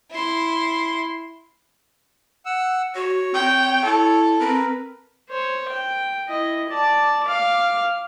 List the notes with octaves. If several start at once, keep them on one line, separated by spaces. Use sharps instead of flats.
E4 C6
F#5 E6
F#4 C#5
C4 G5
E4 A4
C4 A#4 B4
C5 C#5
G5
E4 D#5
D5 A5
F5 D6